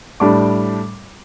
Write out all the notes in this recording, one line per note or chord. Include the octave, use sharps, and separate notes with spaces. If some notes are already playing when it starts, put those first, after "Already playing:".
A2 G3 D4 D6